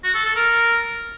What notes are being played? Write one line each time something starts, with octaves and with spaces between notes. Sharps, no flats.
F#4
A4
A4
A#4